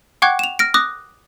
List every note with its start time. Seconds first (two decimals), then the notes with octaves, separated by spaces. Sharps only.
0.22 F#5 G5 C#6 D6 F#6 G#6
0.39 E7 F7
0.59 F6 A#6 D7
0.74 D6 D#6 F#6 A#6